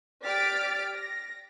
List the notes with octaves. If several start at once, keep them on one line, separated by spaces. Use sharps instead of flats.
G4 D5 F6 A6 B6 D7
A#6